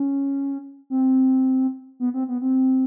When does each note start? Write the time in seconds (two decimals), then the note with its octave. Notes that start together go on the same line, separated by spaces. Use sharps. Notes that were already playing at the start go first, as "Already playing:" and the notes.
Already playing: C#4
0.90 C4
2.00 B3
2.14 C4
2.28 B3
2.41 C4